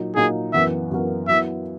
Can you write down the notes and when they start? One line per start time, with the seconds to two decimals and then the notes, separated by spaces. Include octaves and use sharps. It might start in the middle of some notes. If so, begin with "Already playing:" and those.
Already playing: A#2 F#3 A#3 D#4
0.15 A#2 F#3 A#3 D#4 G#4
0.53 F#2 E3 B3 F#4 A#4 E5
0.90 F#2 E3 B3 F#4 A#4
1.28 F#3 B3 E4 E5